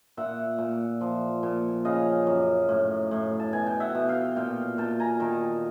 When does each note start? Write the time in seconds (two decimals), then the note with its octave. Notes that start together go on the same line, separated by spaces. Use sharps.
0.17 A#2 E5 F#5
0.58 A#2
1.01 F3
1.43 A#2
1.85 C#3 D#5 F5
2.27 F#2
2.69 A2
3.11 A2
3.39 A5
3.53 B2 G#5
3.67 G5
3.80 E5 F#5
3.95 B2
4.08 F5 G5
4.36 A#2 F5 G5
4.78 A#2 G5 A5
5.00 G#5 A#5
5.20 D#3 G5 A5